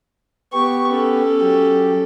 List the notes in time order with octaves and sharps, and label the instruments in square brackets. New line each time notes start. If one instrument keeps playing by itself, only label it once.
[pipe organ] B3 G4 [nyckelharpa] C#6
[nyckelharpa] C#4 A4
[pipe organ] F#3 G4